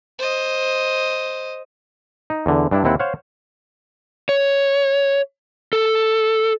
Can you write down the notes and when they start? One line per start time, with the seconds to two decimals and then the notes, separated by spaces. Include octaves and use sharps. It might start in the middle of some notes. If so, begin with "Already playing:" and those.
0.19 C5 D#5
2.30 D#4
2.46 E2 D3
2.71 G2 D4 E4
2.84 D#2 C4 E4 F#5
2.99 C5 C#5 F5 F#5
4.29 C#5
5.73 A4